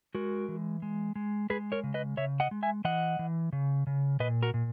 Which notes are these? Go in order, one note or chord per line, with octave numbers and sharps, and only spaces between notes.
G#3 F#4 A#4
E3
G#3
G#3
G#3 G#4 B4
A#4 C#5
C#3
B4 D#5
C#3 C#5 E5
D#5 F#5
G#3
E5 G#5
E3 D#5 F#5
E3
C#3
C#3
A#2 B4 D#5
F#4 A#4
A#2